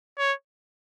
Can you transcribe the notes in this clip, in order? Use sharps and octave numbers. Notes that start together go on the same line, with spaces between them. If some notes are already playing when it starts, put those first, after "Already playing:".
C#5